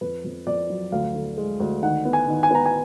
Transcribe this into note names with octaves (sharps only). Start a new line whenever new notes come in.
F2 B4
F2
F2 D5
F#3
D2 F5
D3
G#3
D2
D#3 F#5
B3
G#5
D#3
G#5
B3 A#5
G#5